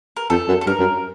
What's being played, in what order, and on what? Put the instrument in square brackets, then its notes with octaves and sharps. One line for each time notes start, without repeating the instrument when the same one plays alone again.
[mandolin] A#4
[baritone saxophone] F2 [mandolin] A4
[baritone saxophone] F#2
[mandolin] A4
[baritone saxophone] G2 [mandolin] A#4
[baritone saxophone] F#2